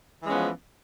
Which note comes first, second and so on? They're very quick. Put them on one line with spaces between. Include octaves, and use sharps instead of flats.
E3 G#3 C#4 B3 F3